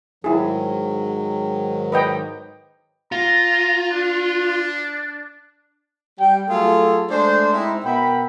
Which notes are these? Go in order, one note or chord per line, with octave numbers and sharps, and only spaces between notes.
G#2 D#3 F#3 E4 G#4
B4 D#5 G5
F4 A#5
D4
G3 G5
F#3 A3 F4 G#4 A4
G#3 A3 D4 C5
G#3 C4 D#4 E4
B2 A#4 E5 F#5 G5 B5